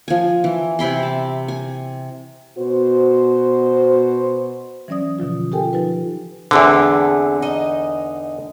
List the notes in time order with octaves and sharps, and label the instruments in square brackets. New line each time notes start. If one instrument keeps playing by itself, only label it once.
[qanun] F3 G#5
E3
C3 E4 B5 C6
A5
G#5
[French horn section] B2 B3 F#4 C5
[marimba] E3 F#3 C#4 D5 D#6
B2 D3 F3 F4
F4 G4 A4 A#4 G5 G#5
F3 D#4 F4 B4
[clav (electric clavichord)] E2 D3 [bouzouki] G#3 A3 C4
[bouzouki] D#4 D#5